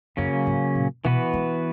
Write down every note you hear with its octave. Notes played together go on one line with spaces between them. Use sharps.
F#2 C#3 F#3 A#3 C#4
G#2
A#2
B2 E3 B3 F#4 B4
G#3